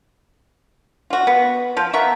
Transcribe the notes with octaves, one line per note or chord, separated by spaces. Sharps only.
F4 F#4
B3
F3 F4
B3 A#4 E5 C#6